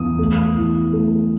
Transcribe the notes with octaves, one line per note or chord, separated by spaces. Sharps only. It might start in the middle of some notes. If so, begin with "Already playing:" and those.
Already playing: E2 D#6
A3
E3
A3